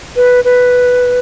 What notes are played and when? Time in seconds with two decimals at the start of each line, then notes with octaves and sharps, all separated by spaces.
0.16 B4
0.44 B4